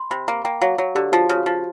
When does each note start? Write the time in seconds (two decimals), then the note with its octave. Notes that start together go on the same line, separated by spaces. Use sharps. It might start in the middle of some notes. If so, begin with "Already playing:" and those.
Already playing: B5 C6
0.11 C3 B5
0.28 A#3
0.44 A#3 G5
0.61 F#3 F5
0.78 F#3 C#5
0.95 D3 G4
1.12 F3 F#4
1.29 C#3
1.38 F#4
1.46 F3